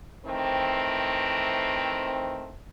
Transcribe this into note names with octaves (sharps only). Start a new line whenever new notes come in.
D#3 E3 A3 C4